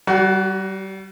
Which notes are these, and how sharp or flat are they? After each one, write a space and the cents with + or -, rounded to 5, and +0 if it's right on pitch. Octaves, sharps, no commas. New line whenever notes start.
G3 -30 F#4 +15